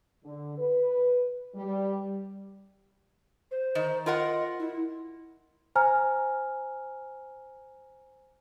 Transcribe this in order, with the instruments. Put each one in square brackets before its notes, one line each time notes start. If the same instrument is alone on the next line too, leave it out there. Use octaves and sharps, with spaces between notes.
[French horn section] D3
B4
G3
[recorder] C5
[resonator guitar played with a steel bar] D#3
[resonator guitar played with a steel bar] F4 A#4 F#5 [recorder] D#5
[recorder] E4
[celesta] C5 G#5 A#5 F6